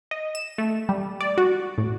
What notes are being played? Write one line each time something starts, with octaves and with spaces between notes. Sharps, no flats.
D#5
E7
A3
G3
D5
F#4
A2